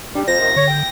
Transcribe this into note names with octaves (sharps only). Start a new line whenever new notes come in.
G3 D4
F2 C5 A#6
C3 D#3 F3
D3 C#5
G5